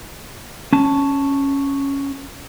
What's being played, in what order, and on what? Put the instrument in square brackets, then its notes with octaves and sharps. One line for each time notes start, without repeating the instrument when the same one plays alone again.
[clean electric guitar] C#4 A5